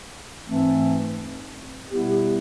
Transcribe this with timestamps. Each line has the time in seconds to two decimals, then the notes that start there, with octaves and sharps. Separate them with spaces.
0.47 G#2 E3 A3 C4
1.90 B2 G3 B3 E4 G4